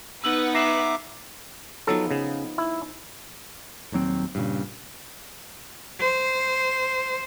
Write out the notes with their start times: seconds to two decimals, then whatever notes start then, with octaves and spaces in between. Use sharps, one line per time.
0.24 B3 D#4 B4 F#5 E6 F#7
0.55 E5 A#5 D6 A#6 C7 E7
1.87 F3 F#3 B3 D#4 A4
2.11 C#3
2.58 E4
3.92 D#1 D#2 F#3 C4
4.35 G2 A#2 C#3
6.00 C5